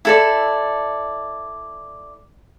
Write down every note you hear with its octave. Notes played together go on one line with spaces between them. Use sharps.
E4 A4 D5